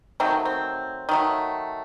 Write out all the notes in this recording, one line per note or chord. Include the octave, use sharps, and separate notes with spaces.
D#3 F#3 A3 C4
C4
D#3 F#3 A3